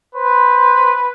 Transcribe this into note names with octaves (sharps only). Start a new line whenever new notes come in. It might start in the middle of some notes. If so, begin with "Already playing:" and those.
B4 C5